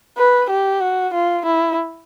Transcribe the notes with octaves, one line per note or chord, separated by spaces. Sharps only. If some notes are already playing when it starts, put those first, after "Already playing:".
B4
G4
F#4
F4
E4